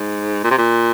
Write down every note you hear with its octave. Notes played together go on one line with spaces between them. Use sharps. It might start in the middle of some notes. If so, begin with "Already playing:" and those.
Already playing: G#2
A#2
C3
A#2